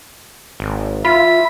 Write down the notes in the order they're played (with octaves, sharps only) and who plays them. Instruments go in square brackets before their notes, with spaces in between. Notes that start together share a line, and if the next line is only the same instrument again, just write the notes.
[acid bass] G#1
[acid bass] F4 [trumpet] E5 [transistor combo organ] B5